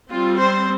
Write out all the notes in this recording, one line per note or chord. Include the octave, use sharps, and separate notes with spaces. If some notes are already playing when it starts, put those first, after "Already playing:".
G3 C4 F4
C5